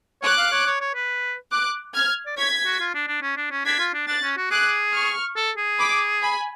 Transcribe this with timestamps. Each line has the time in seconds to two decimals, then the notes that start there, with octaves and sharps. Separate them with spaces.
0.23 C#5 D6 F#6
0.38 F5
0.52 C#5
0.66 C#5
0.81 C#5
0.95 B4
1.51 D6 F#6
1.94 F6 G#6
2.26 D5
2.37 C#5 G#6 B6
2.66 F#4
2.80 F4
2.95 D4
3.08 D4
3.22 C#4
3.37 D4
3.51 C#4
3.65 D4 G#6 B6
3.79 F4
3.94 D4
4.08 D4 F#6 A6
4.23 C#4
4.37 F#4
4.51 G#4 D6 F#6
4.93 C#6 F6
5.36 A4
5.57 G#4
5.79 B5 D6
6.22 G#5 B5